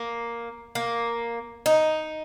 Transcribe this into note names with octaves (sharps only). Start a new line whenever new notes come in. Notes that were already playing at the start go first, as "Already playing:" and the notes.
Already playing: A#3
A#3
D#4